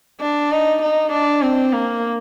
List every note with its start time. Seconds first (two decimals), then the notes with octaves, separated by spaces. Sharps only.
0.21 D4
0.52 D#4
0.82 D#4
1.12 D4
1.42 C4
1.73 A#3